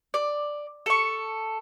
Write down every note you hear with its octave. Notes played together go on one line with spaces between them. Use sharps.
D5
A4 C#6